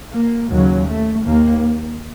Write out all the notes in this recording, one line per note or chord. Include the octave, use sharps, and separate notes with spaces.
A#3
D#2 C#3 F#3
A3
D#2 A#3